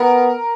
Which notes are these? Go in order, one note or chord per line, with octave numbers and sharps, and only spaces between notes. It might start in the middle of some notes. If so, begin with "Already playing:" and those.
Already playing: B3 A#4